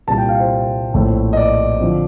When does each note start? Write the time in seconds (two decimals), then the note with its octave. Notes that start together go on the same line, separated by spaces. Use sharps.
0.07 C2 A#2 G3 A5
0.18 G5
0.29 F5
0.40 C5
0.94 A#1 A2 A3 C4
1.33 D#5
1.37 D5
1.80 D3 F3 C4